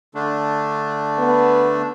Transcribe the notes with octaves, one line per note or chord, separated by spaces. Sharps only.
D3 A3 D4
B3